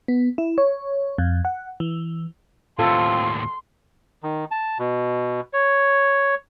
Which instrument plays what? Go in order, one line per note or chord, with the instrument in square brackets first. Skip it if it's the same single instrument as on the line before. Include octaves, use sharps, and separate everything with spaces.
[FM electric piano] B3
E4
C#5
F2
F#5
E3
[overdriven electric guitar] D#2 A2 [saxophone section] C4 F4 [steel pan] A4 [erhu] C6
[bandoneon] D#3
A5
B2
C#5